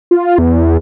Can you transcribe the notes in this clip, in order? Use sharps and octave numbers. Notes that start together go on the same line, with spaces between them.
F4
E2